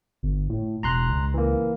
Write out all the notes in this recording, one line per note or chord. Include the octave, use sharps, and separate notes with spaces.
G1
A2
E1 A#5 C6 F#6
C#2
E3 A#3